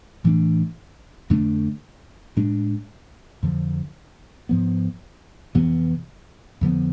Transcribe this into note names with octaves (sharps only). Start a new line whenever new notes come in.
A2 E3 A3 D4
F2 D3 A3 D4
A2 G#3 D4
F2 D3 F3
G#2 F3 B3
F2 C3 E3 B3
F2 D3 F3 B3